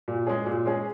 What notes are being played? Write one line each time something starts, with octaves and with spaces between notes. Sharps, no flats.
A#2
G#3 C#4 G#4
A#2
G#3 C#4 G#4